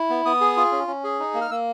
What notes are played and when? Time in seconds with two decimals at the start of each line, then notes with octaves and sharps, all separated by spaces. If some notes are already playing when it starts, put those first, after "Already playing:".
Already playing: E4
0.10 B3
0.25 B3 D#6
0.41 G#4
0.57 F4
0.72 C#4
0.87 C#4
1.04 G#4
1.20 D#4
1.34 A#3
1.41 F6
1.51 A#3 E6